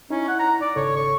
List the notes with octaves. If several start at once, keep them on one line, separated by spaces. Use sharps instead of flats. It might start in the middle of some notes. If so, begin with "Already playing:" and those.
C#4 D#4 E4
F#5
A#5
D5
G#1 C#3 A4 C#5
C#6